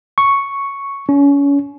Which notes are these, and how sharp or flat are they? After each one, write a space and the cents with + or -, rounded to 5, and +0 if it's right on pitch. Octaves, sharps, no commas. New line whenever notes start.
C#6 +0
C#4 +30